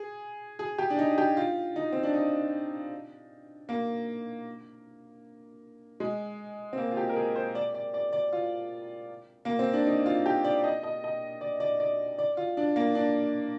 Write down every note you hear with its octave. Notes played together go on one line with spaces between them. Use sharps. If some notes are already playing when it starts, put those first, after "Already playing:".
Already playing: G#4
G#4
G4
D4
D#4
G4
F4
D#4
C4
D4
D#4
A#3
G#3
C4
A#3
F4
G4
A#4
G#4
C5
D5
D5
D5
D5
F4
A#3
C4
D4
D#4
F4
G4
D5
D#5
D#5
D#5
D5
D5
D5
D5
F4
D4
A#3
D4